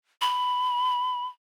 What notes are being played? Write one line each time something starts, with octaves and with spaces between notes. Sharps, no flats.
B5